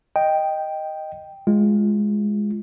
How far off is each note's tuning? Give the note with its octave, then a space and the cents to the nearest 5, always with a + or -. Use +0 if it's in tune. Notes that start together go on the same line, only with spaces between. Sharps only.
D#5 +0 G5 +0
G#3 +0 F4 -15